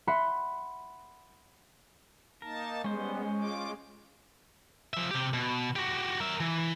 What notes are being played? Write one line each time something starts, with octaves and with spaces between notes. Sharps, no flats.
E5 F#5 B5 C6
A#3 D#4 A#4 A5
G3 G#3 B3 C#4 C5
F4 D6
F3 E5
C3 G4
B2
F#4 G4
A#4 E5
E3